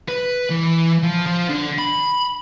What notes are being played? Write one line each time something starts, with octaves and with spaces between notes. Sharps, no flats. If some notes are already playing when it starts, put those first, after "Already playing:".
B4
E3
F3
F3
D3
B5